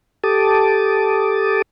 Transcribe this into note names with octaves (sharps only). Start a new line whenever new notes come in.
G4 A4 A5 D6 D#6